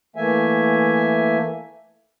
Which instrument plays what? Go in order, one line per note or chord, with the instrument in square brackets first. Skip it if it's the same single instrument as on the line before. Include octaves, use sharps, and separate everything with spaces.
[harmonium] E3 A3 A#3 E5 G#5